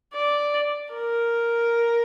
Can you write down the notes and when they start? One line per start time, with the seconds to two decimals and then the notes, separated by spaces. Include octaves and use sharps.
0.13 D5
0.94 A#4